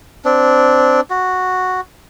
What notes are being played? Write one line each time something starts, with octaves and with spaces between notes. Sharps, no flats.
C4 D4
F#4